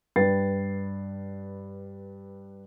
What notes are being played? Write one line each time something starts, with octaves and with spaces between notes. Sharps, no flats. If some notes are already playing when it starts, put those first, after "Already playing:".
G2 B4 G5 A6 C7